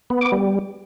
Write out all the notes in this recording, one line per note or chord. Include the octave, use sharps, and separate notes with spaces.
B3
D6
G3